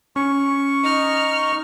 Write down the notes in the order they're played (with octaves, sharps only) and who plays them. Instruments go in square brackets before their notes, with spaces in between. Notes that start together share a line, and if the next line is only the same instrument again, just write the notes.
[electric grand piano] C#4 [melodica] C#6
[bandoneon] D#4 D#5 [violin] F6